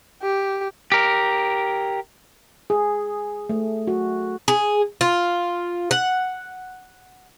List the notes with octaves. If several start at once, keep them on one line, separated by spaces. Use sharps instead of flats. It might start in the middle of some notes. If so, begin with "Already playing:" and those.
G4
G4 A#4
G#4
A3
F#4
G#4
F4
F#5